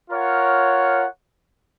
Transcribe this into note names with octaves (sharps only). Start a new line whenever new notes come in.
F4 A#4 C#5 F#5